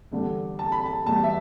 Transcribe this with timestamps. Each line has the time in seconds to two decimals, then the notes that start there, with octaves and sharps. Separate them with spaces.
0.12 E2 D3 G3 D4
0.59 A5
0.72 B5
0.86 A5
1.06 E2 B2 G3 A5
1.24 E5